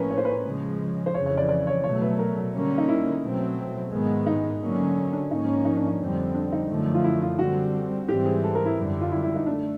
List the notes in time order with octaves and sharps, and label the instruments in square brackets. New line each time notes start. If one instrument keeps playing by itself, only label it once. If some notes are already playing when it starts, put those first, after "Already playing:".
Already playing: [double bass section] A2 F3 A#3 C#4 [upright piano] A#4 B4
[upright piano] C#5
C5
B4
C5
[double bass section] C#3 F3 G#3
[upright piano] C5
[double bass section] F2 C#3 E3 [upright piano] C#5
[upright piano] C#5
D5
D5
C#5
[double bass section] B2 F#3 A3 [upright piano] C#5
[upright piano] B4
A#4
[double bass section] D3 G3 A#3 C#4
[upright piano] D#4
E4
[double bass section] B2 F#3 A3 C4
G#2 D#3 G#3 B3
[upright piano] D#4
[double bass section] D3 F#3 A#3 C#4
[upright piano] D4
[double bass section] G#2 F3 A#3 C#4 [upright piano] D#4
[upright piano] D#4
D4
D#4
[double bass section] F2 D3 G3 C4
[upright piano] D4
D#4
[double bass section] F#2 D3 F3 A3
[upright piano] F4
E4
F4
[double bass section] D3 G3 C4 [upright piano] F#4
[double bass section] G#2 E3 G3 C4 [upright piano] G4
[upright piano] G#4
A4
A#4
E4
[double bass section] F#2 D3 G3
[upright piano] F4
E4
E4
D#4
[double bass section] A3 [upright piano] D4